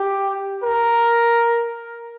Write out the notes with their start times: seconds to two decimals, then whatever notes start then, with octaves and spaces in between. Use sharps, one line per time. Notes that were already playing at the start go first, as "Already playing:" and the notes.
Already playing: G4
0.64 A#4